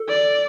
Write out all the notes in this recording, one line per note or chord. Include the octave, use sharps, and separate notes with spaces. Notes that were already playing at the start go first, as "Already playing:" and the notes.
Already playing: A4
D5